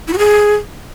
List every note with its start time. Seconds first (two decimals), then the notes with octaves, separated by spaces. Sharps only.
0.08 E4
0.13 F#4
0.18 G#4